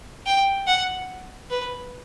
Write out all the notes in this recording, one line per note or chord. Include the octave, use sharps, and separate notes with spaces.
G5
F#5
B4